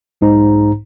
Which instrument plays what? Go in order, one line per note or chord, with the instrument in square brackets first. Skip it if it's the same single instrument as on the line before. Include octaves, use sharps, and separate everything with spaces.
[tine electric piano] B1 G#2 D#4 C5 A#5